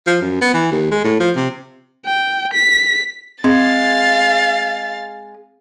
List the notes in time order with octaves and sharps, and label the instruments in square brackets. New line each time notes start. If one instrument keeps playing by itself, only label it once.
[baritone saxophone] F3
F#2
B3
E3
D#2
G#3
A2
F3
C3
[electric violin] G5
B6
[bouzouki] G#3 [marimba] C4 [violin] F5 A6